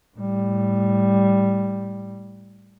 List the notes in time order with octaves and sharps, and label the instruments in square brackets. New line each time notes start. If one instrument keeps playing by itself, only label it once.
[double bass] A2 G3